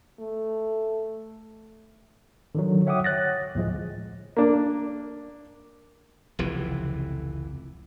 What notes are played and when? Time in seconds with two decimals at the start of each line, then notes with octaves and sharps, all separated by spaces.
0.20 A3
2.55 D3 D#3 F#3
2.87 C#5 E5 F#5 G5 D6 D#6
3.04 C#5 F#6 A6 A#6
3.55 D2 A2 F3 G#3
4.37 A#3 D4
6.39 F1 C#2 C3 E3